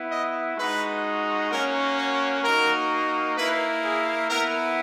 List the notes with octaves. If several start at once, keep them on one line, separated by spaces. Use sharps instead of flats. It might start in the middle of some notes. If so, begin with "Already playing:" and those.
Already playing: B3 E4
D#5
G#3 D#4 F#4 B4
A#3 C#4 F#4 A#4
C#5
A#3 D#4 F#4 A#4
A#3 E4 B4
G#4
B3 E4 A#4